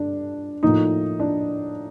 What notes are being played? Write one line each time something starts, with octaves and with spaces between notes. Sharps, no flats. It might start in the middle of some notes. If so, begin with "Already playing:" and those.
Already playing: G2 D3 D4
A2 F3 A#3 D#4
D4